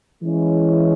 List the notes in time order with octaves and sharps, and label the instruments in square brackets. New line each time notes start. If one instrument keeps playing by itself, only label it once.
[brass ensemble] E3 G#3 C#4 E4